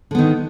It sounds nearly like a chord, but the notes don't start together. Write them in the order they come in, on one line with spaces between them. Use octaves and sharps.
D3 B3 D#3